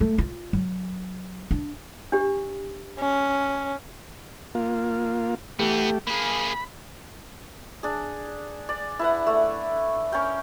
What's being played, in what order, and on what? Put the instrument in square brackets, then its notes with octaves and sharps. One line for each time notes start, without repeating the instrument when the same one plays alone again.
[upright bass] A3
F4
F#3
D4
[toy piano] D4 G4
[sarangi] C#4
[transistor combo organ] A#3 F4
[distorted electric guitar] E3 B3 [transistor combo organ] A3 G4
[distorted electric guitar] A#3 G#4 [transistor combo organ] B5
[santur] D4 G#4
D5
E4 B4 F#5
A3
C#4 A#4 G5